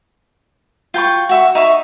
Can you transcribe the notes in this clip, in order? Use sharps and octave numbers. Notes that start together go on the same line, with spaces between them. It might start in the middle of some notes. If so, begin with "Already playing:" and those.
F4 G5 A#5 C#6
F#4 E5 C#6
D#4 E5 C#6